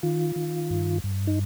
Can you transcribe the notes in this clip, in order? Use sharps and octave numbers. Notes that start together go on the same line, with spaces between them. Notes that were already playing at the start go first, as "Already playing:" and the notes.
D#3 F4
D#3
G2
G2
D#4